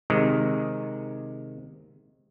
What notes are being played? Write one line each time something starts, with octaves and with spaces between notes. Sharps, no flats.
C3 D#3 G#3